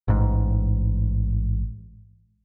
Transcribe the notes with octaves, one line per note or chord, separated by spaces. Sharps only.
A1 G#2